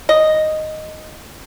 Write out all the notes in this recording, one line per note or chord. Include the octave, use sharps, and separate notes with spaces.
D#5